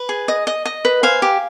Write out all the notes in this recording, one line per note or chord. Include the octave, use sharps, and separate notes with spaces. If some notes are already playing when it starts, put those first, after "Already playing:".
Already playing: B4
G#4
D#5
D#5
D#5
B4
C5 F5 G#5
G4